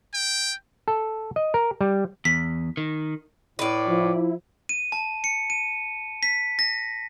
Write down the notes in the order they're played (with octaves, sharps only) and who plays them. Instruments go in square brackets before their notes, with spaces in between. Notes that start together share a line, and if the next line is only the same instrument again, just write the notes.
[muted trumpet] G5
[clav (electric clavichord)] A4
D#5
A#4
G3
[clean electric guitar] E2 [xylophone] B6
[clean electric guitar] D#3
[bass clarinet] A2 [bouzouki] B4 D5
[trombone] F3 [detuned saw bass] E4
[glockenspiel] D#7
A5
C#7
D#7
B6
A#6